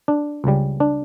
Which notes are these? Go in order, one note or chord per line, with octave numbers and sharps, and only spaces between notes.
D4
C#2 C#3 G3
D4